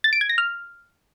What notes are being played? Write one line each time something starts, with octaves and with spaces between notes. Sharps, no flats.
A6
D7
G#6
A#6
F6